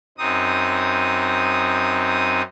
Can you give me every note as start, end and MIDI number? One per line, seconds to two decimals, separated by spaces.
0.18 2.42 42
0.18 2.42 60
0.18 2.42 63
0.18 2.42 87